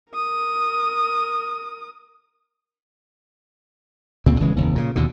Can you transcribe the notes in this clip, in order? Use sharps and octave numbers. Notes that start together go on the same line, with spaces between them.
A#4 D#6
D2 A#2 C#3 C4
D#1 C#3 E3 G#3
F1 D#2
A#2 C#3
D#2 B2 D3